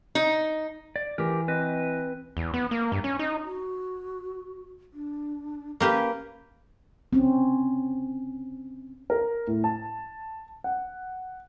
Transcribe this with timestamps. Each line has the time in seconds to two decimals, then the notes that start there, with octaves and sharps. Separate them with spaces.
0.15 D#4
0.96 D5
1.18 E3 G4 A#4
1.48 C4 B4 D#5
2.37 E2
2.54 B3
2.71 A#3
2.92 G2
3.04 C#4
3.19 D#4
3.44 F#4
4.93 D4
5.80 A#3 C#4 G4 B4
7.13 C4 C#4
9.10 A#4
9.47 A2
9.64 A5
10.64 F#5